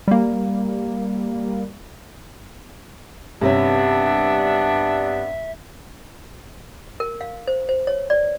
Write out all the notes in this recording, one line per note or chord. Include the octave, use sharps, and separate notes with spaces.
G3 A#3
G2 C3 B3 C#4 D4 E5
A#4
F5
C5
C5
C#5
D5